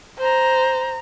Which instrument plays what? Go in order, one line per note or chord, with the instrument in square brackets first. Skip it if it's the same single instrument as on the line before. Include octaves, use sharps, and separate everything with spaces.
[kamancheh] C5 A#5